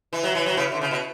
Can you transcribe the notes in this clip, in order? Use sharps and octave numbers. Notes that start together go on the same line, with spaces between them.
E3
F#3
E3
F#3
C#3 E3
D3
C#3
B2